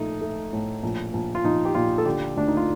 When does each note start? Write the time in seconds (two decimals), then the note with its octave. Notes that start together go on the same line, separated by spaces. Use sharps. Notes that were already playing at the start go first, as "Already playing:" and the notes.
Already playing: A#1 A3 D#4
0.21 A3
0.53 A2
0.83 A#1
1.13 A#1
1.35 F4
1.44 A#1 D#4
1.65 G4
1.74 A#2 F4
1.98 A4
2.05 D3 G4
2.36 D2 D4
2.48 D#4
2.57 F4